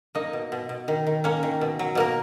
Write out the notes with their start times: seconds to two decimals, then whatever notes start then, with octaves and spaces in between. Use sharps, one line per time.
0.15 A#3 D#4 D#5
0.33 B2
0.52 B2
0.69 B2
0.88 D#3
1.07 D#3
1.24 A#3 C#4 C#5
1.43 D#3
1.61 B2
1.79 F#3
1.95 B2 A#3 A#4